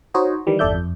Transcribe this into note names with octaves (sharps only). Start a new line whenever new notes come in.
D#4 F#4 C5 C#5 D#5
D#3 E3 G3
G1 E2 A4 D5 E5 G6
F2